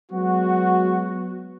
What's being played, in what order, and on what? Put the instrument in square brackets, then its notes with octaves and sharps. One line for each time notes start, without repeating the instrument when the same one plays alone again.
[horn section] F#3 G#3 B3 F#4